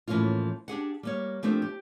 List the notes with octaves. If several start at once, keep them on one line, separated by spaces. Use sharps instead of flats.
A2 E3 F3 A#3 C#4 F4
D4 G4 G#4 F#5
G3 A#3 C#5
F3 A3 A#3 C4 D4 G4
G4